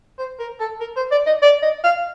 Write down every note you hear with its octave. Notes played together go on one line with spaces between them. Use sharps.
C5
A#4
A4
A#4
C5
D5
D#5
D5
D#5
F5